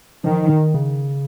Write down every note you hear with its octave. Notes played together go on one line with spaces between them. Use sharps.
D#3 F3
D#3
C#3